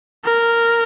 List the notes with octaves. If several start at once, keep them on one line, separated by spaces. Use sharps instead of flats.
A#4